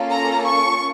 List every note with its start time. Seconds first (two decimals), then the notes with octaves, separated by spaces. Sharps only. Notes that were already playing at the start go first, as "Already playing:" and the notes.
Already playing: A#3 C#4 F4 A4
0.11 A#5
0.45 C#6